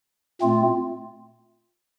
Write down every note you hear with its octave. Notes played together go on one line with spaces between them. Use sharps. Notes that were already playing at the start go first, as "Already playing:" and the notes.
A#2 A3 C4 F4